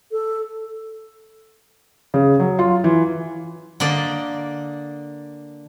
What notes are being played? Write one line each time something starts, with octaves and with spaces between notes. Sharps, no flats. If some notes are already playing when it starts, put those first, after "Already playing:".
A4
C#3
F#3
F4
E3
D3 A#3 D5 D#5